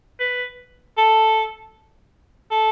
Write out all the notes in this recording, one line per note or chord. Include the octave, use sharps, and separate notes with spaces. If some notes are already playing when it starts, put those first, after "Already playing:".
B4
A4
A4